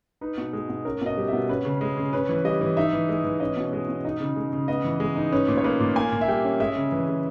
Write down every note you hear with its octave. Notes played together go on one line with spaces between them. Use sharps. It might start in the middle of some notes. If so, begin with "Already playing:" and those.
D#4 B4
B2
G#3
B2
C#4 A#4
B2 D#5
G3
B2 E5
C#4 B4
C#3
G#3
C#3
C#4 B4
E3
G3 D#5
E3
D#4 E5
E3
G#3
E3
C#4 D#5
B2
G#3
B2
D#4 D#5
C#3
G#3
C#3
B3 D#5
E3
G#3
D#4
C#4 B4
A#2
C#5
A#3 B4
A#2
A#3 G#5
A#2
E5
G3 G5
C#4
G#3 E5
C#3
E3
C#3